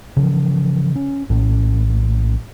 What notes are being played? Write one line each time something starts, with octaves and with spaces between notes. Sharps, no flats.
C#3 E3 F3
C#4
A#1 A2 C#4